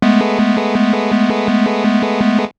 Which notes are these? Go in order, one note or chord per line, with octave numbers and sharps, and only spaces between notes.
G#3 A3 B3